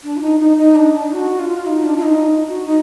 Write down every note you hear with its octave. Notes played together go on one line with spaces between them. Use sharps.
D4
F4
D#4
D#4
D#4
D4
D4
F#4
F4
D#4
D4
F4
D#4
F#4
D#4